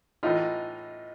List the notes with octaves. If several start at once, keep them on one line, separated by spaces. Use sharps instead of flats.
A2 E3 D#4 F4